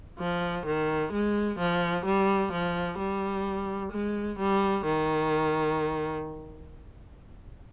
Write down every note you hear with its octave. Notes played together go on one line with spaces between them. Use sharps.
F3
D#3
G#3
F3
G3
F3
G3
G#3
G3
D#3